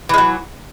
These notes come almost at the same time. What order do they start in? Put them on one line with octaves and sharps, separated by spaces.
E3 G#3 F#3